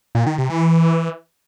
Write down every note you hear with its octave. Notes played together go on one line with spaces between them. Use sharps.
A#2
D#3
C3
E3